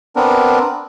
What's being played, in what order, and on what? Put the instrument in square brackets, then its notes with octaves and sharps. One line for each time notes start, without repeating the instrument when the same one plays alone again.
[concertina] B3 C4 D4 A#4